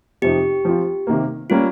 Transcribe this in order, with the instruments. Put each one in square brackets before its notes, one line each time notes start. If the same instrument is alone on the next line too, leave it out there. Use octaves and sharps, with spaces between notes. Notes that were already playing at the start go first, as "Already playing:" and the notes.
[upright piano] F2 C3 F3 C4 D#4 [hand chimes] G4
[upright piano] F3 C4 F4
C3 D#3 A#3
[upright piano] G3 A#3 C#4 [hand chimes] F4